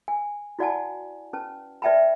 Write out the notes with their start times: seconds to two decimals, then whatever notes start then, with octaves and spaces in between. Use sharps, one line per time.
0.08 G#5
0.59 E4 F#4 D5 F#5 G#5 A5
1.33 C#4 B4 A5
1.82 B4 D5 E5 G5 A5 B5